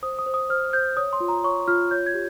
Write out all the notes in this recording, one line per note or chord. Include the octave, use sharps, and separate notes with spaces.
C5 D#6
D#6
C5
D#6
C5 F6
C5 G6
C#5 D#6
C6
F4
A#5
C#5 C#6
F4 F6
C#5 G6
G#6
G4